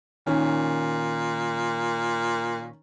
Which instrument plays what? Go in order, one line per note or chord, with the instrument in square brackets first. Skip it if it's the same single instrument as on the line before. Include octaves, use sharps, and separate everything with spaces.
[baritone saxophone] A#2 [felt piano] D#3 C#4